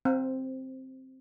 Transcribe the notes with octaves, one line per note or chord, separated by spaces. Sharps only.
C4